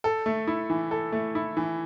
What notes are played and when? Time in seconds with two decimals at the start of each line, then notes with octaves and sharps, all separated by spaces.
0.04 A4
0.26 A3
0.47 E4
0.70 E3
0.91 A4
1.12 A3
1.35 E4
1.57 E3